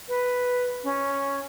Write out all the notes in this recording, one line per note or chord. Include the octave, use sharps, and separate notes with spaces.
B4
C#4